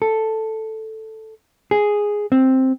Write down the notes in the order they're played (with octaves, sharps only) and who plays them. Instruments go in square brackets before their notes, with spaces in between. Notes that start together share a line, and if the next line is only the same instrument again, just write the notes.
[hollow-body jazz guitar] A4
G#4
C4